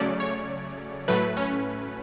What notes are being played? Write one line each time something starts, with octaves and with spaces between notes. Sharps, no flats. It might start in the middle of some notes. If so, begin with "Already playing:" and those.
Already playing: C#3 F#3 A3 C#4 D5
C#5
A2 F#3 A3 B4
C#4